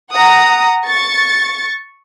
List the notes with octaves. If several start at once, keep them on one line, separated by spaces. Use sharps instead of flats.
F#5 A#5 D#6
C#6 A6